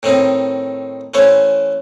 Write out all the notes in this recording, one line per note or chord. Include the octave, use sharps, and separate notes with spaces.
A2 D#3 C4 D#4
E3 A3 C#4 C5 C#5